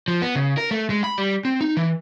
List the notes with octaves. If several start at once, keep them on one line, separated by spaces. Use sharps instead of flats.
F3
B3
C#3
A#4
A3
G#3
B5
G3
C4
D#4
E3